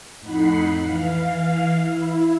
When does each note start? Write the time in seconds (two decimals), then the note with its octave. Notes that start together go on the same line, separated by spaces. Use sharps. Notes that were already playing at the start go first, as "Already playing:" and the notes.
0.20 F2 A2 D#4 F#5 B5 C7
0.81 E3 F5
1.78 E4